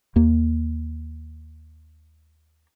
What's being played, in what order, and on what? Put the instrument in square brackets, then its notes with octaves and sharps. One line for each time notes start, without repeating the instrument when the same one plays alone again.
[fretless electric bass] D#2 A#3